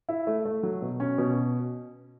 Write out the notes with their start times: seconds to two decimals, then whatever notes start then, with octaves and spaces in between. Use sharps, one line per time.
0.09 E4
0.27 A3
0.45 A3
0.63 F#3
0.82 B2
1.00 C#4
1.18 B2